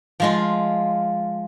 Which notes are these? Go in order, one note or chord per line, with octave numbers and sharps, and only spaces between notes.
F3 G#3 F4